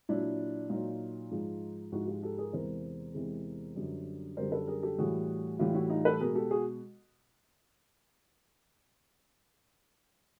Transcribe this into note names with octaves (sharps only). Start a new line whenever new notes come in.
A#2 F#3 D4 E4
A#2 F#3 D#4 F4
G#2 F3 G#3
G#2 F3 G#3 E4 F#4
F4 G4
G4 A4
G#4 A#4
E2 C3 E3 G#3 A#4 C5
E2 C3 E3 G#3
F#2 D3 G3
F#2 D3 G3 A#4 C5
A4 B4
G#4 A#4
G4 A4
A2 E3 G3 F#4 G#4
A2 E3 G3 F4 G4
E4 F#4
D#4 F4
A4 B4
B2 G#3 G#4 A#4
G4 A4
F#4 G#4